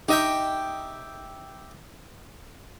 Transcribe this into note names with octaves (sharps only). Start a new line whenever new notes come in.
D#4 G4 D#5 E5 G5